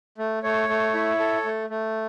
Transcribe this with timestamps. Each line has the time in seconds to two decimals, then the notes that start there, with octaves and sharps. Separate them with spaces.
0.18 A3
0.43 A3 C#5
0.69 A3
0.94 E4
1.19 A4
1.45 A3
1.70 A3